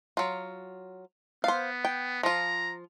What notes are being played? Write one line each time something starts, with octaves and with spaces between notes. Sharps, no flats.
F#3 F4
B3 C5 F5
G5
F3 F4 A#5